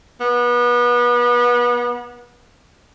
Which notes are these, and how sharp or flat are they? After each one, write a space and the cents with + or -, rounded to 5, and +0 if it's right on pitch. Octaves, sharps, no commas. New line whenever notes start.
B3 -30